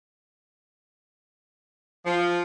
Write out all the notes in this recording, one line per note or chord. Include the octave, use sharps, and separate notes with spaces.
F3